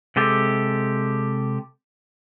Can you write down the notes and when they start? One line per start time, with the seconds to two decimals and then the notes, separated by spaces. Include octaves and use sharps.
0.16 C3 G#3 G4 A4